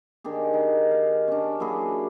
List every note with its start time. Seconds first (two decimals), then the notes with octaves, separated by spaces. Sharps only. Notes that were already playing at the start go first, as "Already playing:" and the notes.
0.24 D#3 D4 G4 G#4
0.54 D#4
0.91 F5
1.28 C#4 D4
1.60 F#3 A#3 E4 G#4